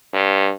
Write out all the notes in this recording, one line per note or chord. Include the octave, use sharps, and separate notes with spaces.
G2